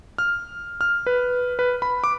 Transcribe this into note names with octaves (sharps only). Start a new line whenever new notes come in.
F6
F6
B4
B4
B5
D6